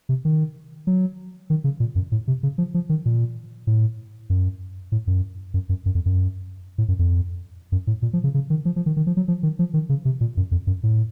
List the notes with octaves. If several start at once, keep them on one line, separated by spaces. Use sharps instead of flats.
C3
D#3
F#3
D#3
C#3
A#2
F#2
A2
C3
C#3
F3
F3
D#3
A#2
A2
F#2
A2
F#2
F#2
F#2
F#2
F2
F#2
A2
F#2
F2
F#2
A2
A#2
F3
C#3
C#3
D#3
F3
F3
D#3
D#3
F3
F#3
F3
D#3
F3
D#3
C#3
C3
A#2
F#2
F2
F#2
A2